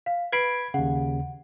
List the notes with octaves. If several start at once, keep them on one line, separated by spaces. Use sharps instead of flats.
F5
B4 B5 G#6 C7 D7
D#2 C#3 F#5